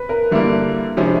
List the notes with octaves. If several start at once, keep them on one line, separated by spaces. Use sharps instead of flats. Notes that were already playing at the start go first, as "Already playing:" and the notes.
Already playing: B4
A#4
G2 D3 G3 A#3 E4
C3 F3 G#3 C#4 D4 E4